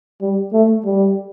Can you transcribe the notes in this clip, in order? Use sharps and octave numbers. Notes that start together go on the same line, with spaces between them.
G3
A3
G3